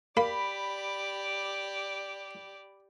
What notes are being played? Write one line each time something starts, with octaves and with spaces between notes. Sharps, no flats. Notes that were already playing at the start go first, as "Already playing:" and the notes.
A#3 G4 D5 B5